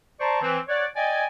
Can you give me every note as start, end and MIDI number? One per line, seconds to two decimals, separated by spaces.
0.20 0.39 72
0.20 0.39 74
0.20 0.39 81
0.20 0.39 82
0.20 0.39 84
0.20 0.39 85
0.42 0.58 52
0.42 0.58 60
0.68 0.86 73
0.68 0.86 74
0.68 0.86 78
0.96 1.25 74
0.96 1.25 75
0.96 1.25 79
0.96 1.25 80